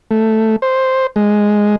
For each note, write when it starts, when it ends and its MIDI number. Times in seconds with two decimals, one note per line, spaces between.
0.11 0.56 57
0.62 1.07 72
1.16 1.76 56